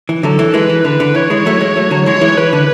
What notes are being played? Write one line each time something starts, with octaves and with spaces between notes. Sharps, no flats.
E3
D3 F#3 A4
E3
E3 G#3 B4
E3
D3 B4
D3
E3 C#5
E3 G#3
F#3 A3
E3 G#3
F#3 A3
D3 F#3
E3 G#3 C#5
F#3
E3 G#3
E3 B4
D3